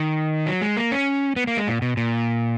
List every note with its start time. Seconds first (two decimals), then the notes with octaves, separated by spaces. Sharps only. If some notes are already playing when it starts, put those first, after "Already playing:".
Already playing: D#3
0.47 F#3
0.62 G#3
0.77 A#3
0.91 C#4
1.36 B3
1.47 A#3
1.57 G#3
1.67 A#2
1.82 B2
1.97 A#2